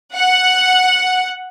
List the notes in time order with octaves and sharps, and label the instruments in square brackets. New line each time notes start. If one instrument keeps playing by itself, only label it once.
[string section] F#5